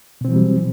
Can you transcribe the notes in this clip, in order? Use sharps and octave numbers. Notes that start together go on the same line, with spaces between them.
B2 E3 F#3 G3 C4